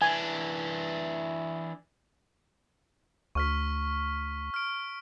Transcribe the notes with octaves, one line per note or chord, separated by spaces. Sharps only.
E3 D4 G#5
D2 C#6 F6 B6
F6 D7